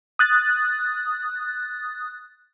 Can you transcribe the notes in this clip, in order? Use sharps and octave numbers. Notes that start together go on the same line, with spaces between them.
D#6 F#6 A6